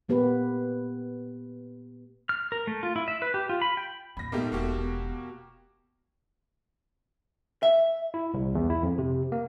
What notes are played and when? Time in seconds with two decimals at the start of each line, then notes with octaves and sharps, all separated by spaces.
0.09 A#2 A#3 B3 G4 B4
2.29 F6
2.52 A#4
2.67 A3
2.83 F4
2.96 E4
3.08 E5
3.22 B4
3.34 G4
3.49 F4
3.62 B5
3.77 G5
4.17 E2 A#2 B5 A#6
4.32 G#2 B2 A3 A#3 D#4 G4
4.52 E1 A#3 F#4 G4
4.78 B2
7.63 E5
8.14 E4
8.34 C2
8.55 E2
8.70 E4
8.83 F2
8.98 C3
9.32 A#3